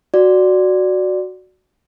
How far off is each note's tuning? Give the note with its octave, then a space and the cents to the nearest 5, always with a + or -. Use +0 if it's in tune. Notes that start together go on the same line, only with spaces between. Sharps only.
F#4 +0 D5 +0